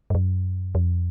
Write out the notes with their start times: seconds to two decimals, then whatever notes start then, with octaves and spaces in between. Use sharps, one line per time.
0.10 G2
0.15 F#2
0.75 F2